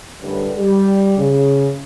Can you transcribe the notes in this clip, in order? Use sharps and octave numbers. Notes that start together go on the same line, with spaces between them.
F#2 A2 D3 G3 A4 B4
G3
C#3